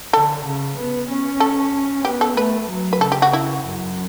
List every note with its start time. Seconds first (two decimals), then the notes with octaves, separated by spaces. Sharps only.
0.13 D3 A4
0.45 C#3
0.77 B3
1.09 C#4
1.40 A4
2.05 B3 G4
2.21 A4
2.37 A3 B4
2.69 F#3
2.93 B4
3.01 C#3 A4
3.12 G4
3.22 F#4
3.33 E4
3.65 F#2